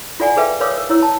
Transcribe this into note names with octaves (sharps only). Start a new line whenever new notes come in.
F4 A4 D5 F#5 G#5
G#4 A4 B4 E5 F5 G5
A#4 B4 C#5 F5 D6 D#6
A#4
E4 C#5 E6
A5